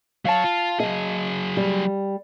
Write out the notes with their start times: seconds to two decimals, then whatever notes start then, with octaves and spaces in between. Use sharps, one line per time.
0.25 F#3 C#5 F5 A5
0.44 F4
0.80 F#3 G#4 D#5
1.57 G3